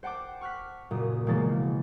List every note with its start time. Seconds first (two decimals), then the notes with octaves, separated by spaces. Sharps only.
0.03 C5 F#5 G5 A5 D6
0.41 C#6 F6 F#6 B6
0.91 F#1 A#2 D#6
1.27 E1 C#3 F3 G#3 A#3 A6